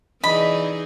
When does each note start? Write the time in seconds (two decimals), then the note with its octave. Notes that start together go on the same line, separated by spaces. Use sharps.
0.24 E3 D#4 G#4 D5 D#5 B5